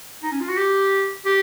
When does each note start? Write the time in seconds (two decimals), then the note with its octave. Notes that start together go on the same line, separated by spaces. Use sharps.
0.23 D#4
0.32 C#4
0.40 F4
0.49 F#4
0.57 G4
1.26 G4